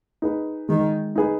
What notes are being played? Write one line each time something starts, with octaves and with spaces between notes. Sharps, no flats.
D#4 G#4 B4
D#3 G#3
D#4 G#4 B4